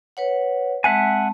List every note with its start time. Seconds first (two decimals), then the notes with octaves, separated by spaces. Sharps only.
0.17 B4 C#5 F#5
0.84 G#3 C4 E5 F#5 G#5 A5